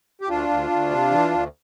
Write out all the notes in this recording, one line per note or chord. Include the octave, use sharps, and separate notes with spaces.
G4
D2 D4 F4
D2
D2
C3
E3
D2